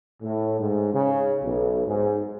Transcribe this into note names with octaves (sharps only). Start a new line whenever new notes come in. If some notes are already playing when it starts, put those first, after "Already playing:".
A2
G#2
C#3
B1
G#2